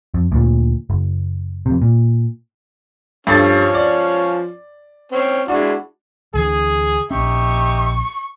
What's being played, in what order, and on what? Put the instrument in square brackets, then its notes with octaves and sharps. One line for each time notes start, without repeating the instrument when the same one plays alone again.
[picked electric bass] F2
D2 A#2
F#1
F2 C3
A#2
[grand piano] G2 A4 A6 [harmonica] F3 C#4
[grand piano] D5
[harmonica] C4 C#4
[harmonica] G#3 E4 F#4 [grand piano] D4
[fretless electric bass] D2 D3 E3 [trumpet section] G#4
[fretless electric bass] A#1 C#4 [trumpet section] D#4 G4 E5 [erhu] C#6